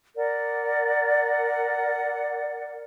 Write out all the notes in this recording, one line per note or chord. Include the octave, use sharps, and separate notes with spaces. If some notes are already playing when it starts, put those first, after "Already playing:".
A#4 D5 F#5